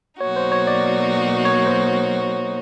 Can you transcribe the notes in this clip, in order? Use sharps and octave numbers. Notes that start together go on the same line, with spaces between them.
B2 F#3 A#3 D#4 F#4 C#5
C5
C#5
D5
C#5
C5